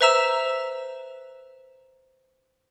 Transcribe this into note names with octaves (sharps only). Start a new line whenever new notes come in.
B4 C5 E5 A#5 E6 E7